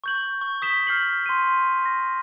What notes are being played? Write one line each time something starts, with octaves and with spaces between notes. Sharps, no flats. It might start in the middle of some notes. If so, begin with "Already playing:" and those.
C#6 G6 F#7
C#6
D#6 B6 E7 G7
F6 G6 C7 F#7
C6 D#7
A#6